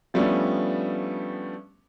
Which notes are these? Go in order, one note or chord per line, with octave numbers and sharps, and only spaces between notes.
F3 G3 A3 B3 C#4 D4